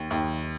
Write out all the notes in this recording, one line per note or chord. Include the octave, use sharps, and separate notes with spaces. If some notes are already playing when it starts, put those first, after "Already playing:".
Already playing: D#2
D#2